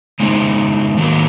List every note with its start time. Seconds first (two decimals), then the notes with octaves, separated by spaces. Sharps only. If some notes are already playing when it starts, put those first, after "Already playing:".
0.20 C#3 G#3 C4 D#4
0.98 D#3 F#3 A#3